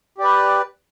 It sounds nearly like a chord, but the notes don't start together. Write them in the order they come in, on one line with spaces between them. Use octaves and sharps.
G4 D5 B4